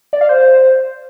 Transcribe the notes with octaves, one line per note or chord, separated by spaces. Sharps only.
D5
F5
C5